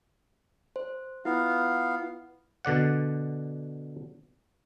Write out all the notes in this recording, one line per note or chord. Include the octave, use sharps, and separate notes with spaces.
C5
B3 E4 F4 B4 F5
B2 D3 D5 F#5